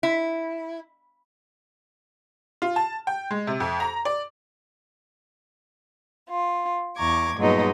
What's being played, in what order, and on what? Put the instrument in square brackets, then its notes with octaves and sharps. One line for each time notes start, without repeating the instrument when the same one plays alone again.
[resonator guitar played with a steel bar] E4
[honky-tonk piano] F4
A5
G5
G#3
C3
F2
A#5
D5
[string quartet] F4
E2 A#5 C#6 D6 G#6
G2 A#2 F#3 G#3 B3 D#4